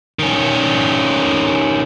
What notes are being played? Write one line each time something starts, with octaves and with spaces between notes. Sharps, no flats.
D#3 C#4